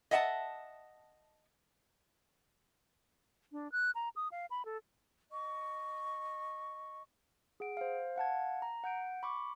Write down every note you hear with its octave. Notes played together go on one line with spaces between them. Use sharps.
D#5 E5 F#5 G#5 A5
D4
F#6
A#5
D#6
F5
B5
A4
D#5 C#6
G#4 F#5 D7
C5 F5
F5 F#5 A5 G#6
A#5
F#5 G6 D7
B5 C#6 D6